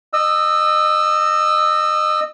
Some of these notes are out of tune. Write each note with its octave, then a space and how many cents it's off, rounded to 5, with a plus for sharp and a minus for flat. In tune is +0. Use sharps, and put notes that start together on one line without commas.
D#5 -25 E6 +0